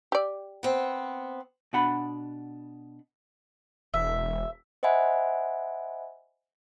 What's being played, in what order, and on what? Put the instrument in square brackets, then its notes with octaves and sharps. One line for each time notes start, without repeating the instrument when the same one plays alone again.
[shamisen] G4 D5
[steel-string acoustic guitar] B3 C4
[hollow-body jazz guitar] B2 D4 F#5 B5
[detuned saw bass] E1 [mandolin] E5
[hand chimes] C5 D#5 E5 F#5 G#5 B5